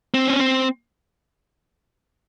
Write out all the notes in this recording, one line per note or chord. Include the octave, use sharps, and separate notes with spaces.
C4
C#4
C4